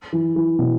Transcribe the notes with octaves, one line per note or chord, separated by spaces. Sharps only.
E3
E3
B2